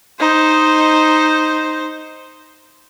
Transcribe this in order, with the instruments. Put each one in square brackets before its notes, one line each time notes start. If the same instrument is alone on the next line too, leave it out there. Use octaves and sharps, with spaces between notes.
[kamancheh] D#4 C5